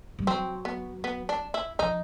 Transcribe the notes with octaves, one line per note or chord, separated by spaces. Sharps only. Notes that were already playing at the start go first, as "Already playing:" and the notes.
G3
F#3 C4
B3
B3
D4
E4
F3 D#4